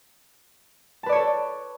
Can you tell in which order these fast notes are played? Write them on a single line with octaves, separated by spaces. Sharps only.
A5 B4 D5 C#5 A4